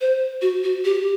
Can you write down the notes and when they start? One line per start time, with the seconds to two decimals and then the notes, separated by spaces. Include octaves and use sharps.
0.01 C5
0.42 F#4
0.64 F#4
0.85 G4